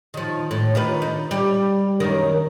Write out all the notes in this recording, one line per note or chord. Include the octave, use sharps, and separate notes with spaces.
D#3 F3
A2
D#3 F4 B4
D#4
G3
F#2 D#3 A#4